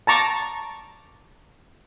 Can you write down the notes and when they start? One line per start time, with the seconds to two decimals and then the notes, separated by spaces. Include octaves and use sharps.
0.07 A5 A#5 C#6 D6